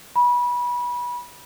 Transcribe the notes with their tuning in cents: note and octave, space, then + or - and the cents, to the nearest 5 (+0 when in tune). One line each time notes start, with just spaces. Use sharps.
B5 -25